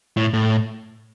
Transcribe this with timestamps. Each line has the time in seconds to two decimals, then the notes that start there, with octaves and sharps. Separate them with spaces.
0.17 A2
0.33 A2